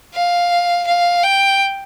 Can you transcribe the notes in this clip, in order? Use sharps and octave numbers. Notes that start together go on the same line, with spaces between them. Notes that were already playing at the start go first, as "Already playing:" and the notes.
F5
F5
G5